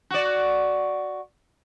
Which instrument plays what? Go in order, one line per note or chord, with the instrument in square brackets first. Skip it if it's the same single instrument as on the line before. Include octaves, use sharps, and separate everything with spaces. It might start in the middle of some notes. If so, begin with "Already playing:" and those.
[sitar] F#4 D5